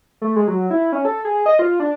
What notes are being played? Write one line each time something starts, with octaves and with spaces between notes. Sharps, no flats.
A3
G#3
F#3
E4
C#4
A4
G#4
D#5
F4
D4